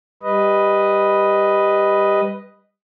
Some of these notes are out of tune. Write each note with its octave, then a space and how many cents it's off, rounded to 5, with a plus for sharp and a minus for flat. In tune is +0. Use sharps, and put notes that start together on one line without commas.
G3 +10 B4 +0 D#5 +0